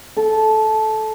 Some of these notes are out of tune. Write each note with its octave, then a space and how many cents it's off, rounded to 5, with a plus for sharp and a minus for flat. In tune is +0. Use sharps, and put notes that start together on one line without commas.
A4 -15